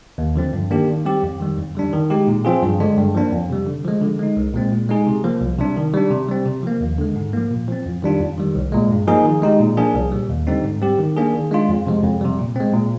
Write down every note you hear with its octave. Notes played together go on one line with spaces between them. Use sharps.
D#2
D3 F3 C4
G2
D#3 A#3 D4 G4
D#3
G3 C4 G4
F2
D#3 G3
F2
D3 G3 D4
D#3
G#3 D#4 G4
A#2
F3 C4 F4 G#4
G2
D3 G#3 D4
G2
F3 A#3 D4
F2
C3 G3
D3
F3 G#3
D3
G#3 D#4
C2
A#2 G#3 C4
A#2
G#3 D#4 G#4
C3
F3 A#3
C2
C3 G3 D4
D#3
G3 D4
C3
G3 C4
C3
F3 A#3
D#2
D3 G#3
G#2
F3 A#3
A#2
F3 C4
F2
D#3 G3 D4 F4
F2
D#3 G3
C2
A#2 G#3
G2
F3 A#3 D#4 G#4
D#3
G#3 D#4 G4
A#2
F3 A#3 D4 G#4
C2
A#2 G3
D#2
D3 G3 C4 D#4
G#2
G3 C4 G4
D#3
A#3 D4 G#4
D#3
G#3 D4 F4
F2
C3 F3 G#3
F2
C3 G3
A#2
G#3 C4
A#2